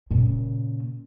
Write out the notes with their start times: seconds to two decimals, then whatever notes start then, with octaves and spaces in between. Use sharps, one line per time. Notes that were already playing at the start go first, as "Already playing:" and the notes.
0.11 A#2 C#3